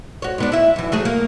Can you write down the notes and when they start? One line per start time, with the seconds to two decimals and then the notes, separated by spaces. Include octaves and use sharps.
0.22 F#4 C#5
0.38 G#2 B3 D4
0.52 E4 E5
0.76 F#2 E3
0.92 F#3 A3 G#4
1.05 A#3